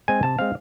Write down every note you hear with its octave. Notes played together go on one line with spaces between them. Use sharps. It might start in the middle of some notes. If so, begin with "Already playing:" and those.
G#3 C4 G#5
C3 A5
G#3 C4 F5